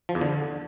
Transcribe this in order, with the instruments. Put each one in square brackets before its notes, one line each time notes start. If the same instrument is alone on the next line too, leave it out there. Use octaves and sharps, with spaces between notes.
[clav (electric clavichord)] F3
E2
D3